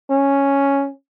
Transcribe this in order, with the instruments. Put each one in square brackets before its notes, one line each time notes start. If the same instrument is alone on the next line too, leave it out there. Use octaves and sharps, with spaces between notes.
[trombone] C#4